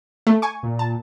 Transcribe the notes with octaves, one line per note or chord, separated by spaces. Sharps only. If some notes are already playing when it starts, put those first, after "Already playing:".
A3
G#5 C#6
A#2
A5